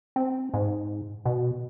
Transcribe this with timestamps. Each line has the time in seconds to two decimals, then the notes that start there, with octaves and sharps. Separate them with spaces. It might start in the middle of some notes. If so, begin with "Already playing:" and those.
0.16 C4
0.54 G#2
1.25 B2